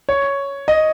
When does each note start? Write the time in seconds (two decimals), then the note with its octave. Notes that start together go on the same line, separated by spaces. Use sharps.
0.09 C#5
0.68 D#5